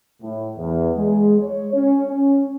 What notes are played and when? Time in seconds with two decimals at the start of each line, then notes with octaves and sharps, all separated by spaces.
0.22 A2
0.57 E2
0.97 G#3
1.39 C#5
1.73 C#4
2.08 C#4